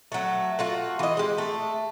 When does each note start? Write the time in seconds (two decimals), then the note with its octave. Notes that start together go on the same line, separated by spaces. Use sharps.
0.12 F#3 A3
0.59 A3 F4 F#4
0.99 E3 D#5
1.17 G#3 G4
1.38 A3